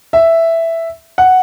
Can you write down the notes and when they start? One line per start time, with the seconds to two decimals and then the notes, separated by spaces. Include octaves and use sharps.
0.13 E5
1.18 F#5